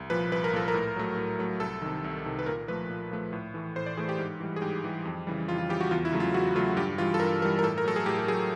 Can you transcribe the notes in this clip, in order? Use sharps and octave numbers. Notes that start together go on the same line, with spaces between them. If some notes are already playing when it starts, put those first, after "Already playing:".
Already playing: C2
A#2 F3 B4
C2 B4
A#4
A#2 F3 A4
A#4
A2
F#3 A3
A2
F#3 A3
C2 A4
C3 D#3
C2
C3 D#3
B4
A#2 A#4
F3 A3 B4
A#2
F3 A3
A2
E3 A3
A2 C5
D5
E3 A3 G#4
G4
G#2
E3 G3
G#4
G#2 G4
E3 G3
F2
C#3 E3 G3
F2 F4
F4
C#3 E3 G3 G4
F#4
E2 F4
E4
C#3 F#3 A3
F4
E2 F#4
C#3 F#3 A3 F4
G2 G4
E3 G3 F4
A4
G2 A#4
E3 G3 A#4
A#4
A2 A4
A#4
F#3 A3 A4
G#4
A2 G4
G4
F#3 A3 G#4